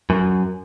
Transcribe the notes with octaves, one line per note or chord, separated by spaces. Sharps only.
F#2